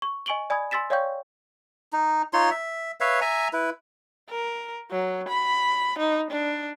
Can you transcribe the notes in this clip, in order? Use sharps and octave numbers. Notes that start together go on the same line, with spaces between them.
C#6
D#5 G#5 C#6 D7 F#7 G7
D5 G#5 B5 D#6 G#6
G#5 C6 E6 A6 B6 E7
C#5 D5 F5 G5 C#6 G6
D#4
D#4 F4 C#5 C6
E5
B4 C#5 E5 F5
E5 G#5 A#5
E4 B4
A#4
F#3
B5
D#4
D4